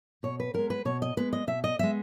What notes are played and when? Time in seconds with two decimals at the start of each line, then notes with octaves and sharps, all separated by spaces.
0.23 B2 C#5
0.40 B4
0.54 G#3 B3 A#4
0.70 B4
0.85 B2 C#5
1.02 D#5
1.17 G#3 B3 B4
1.33 D#5
1.47 B2 E5
1.64 D#5
1.79 G#3 B3 E5